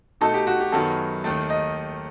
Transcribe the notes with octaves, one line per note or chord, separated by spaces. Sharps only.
B2 A3 D#4 A4
G4
F#4
G4
F#2 D#3 F#3 B3 A4
D#2 D#3 A3
D#5